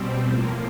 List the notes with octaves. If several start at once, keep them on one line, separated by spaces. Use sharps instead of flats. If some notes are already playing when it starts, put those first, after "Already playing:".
Already playing: B2 G3 C4
A2 F3 A#3